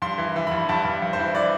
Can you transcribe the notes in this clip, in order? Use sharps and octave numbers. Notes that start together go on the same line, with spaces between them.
G2 C6
E3
E3
G2 B5
G2 A5
G2
G2
C5
E3
E3 D5